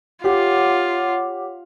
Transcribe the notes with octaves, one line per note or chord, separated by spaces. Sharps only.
F4 G4 C#5 F#5 D6